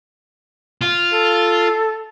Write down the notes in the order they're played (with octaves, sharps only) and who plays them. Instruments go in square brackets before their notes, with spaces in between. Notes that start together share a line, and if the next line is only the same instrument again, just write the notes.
[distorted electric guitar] F4
[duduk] A4